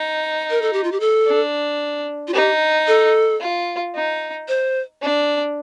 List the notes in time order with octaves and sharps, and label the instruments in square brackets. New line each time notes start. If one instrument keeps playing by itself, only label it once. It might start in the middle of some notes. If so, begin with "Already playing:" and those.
Already playing: [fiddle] D#4
[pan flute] A#4
A4
G4
F4
G4
A4
[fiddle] D4
[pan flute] F4
[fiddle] D#4 [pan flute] G4
[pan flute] A4
[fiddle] F4
D#4
[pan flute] C5
[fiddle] D4